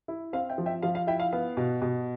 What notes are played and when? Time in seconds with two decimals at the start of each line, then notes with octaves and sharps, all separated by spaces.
0.08 E4
0.33 C4 F5
0.49 E5 G5
0.58 F3
0.66 E5 G5
0.82 F3 F5
0.95 F5
1.07 E4 E5 G5
1.20 F5
1.33 B3 F5
1.57 B2
1.82 B2